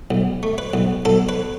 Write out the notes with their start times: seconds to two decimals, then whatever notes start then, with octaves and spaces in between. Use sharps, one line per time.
0.11 B1
0.43 A3
0.58 B4
0.74 B1
1.05 B1 A4
1.29 B4